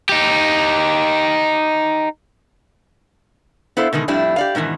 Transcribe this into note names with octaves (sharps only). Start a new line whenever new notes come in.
D#4 G4
B3 E4 A4 C5 F5
B2 D3 D#3 G#3
F2 A2 G3 D4 E4
G4 D5 F5
G#2 B2 D#3 E3